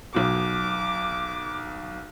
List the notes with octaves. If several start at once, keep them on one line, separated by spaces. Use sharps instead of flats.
B1 B2 D6